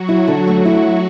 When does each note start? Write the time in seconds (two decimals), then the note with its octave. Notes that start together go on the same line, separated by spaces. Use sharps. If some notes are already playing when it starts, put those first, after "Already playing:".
Already playing: F#3 F#4
0.09 E4
0.28 D3
0.47 A3
0.65 E4